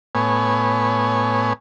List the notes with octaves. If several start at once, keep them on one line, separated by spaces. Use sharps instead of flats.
A2 B3 C#5 G#5